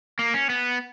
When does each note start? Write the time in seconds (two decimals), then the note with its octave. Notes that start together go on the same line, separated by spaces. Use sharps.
0.19 A#3
0.34 C#4
0.49 B3